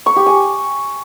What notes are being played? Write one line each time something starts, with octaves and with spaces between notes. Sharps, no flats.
C#6
G4
G#5